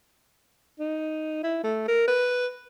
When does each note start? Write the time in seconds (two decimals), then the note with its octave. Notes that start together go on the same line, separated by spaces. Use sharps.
0.79 D#4
1.44 E4
1.64 A3
1.88 A#4
2.08 B4